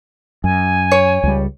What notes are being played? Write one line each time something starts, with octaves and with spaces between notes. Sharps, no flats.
F#2 G#5
C#5
C#2 G3